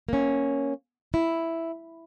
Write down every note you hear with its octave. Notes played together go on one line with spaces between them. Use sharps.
A#3 C#4
E4